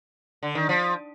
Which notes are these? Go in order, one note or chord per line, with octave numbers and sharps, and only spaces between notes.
D3
D#3
F3